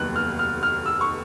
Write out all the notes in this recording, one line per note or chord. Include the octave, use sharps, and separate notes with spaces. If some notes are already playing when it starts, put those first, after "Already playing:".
Already playing: F1 D#2 D#3 F#3 B3 F#6
F6
F6
F6
E6
C#6